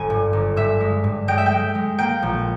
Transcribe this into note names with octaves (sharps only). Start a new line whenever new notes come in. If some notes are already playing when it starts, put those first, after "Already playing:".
Already playing: G1 G#5
G2
G1
G2 E5
G#3
G2
G#3 G5
E5
G5
G#3
G#3
A#3 G5
A#1